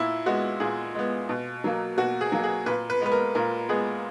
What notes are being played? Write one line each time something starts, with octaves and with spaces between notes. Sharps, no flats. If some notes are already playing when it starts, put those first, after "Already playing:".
Already playing: A#2 E4
G#3 B3 F#4
A#2 G#4
G#3 B3
B2
F#3 A#3
B2 F#4
G#4
F#3 A#3
G#4
A#2 B4
B4
G#3 B3 B4
A#4
A#2 A#4
G#3 B3 G#4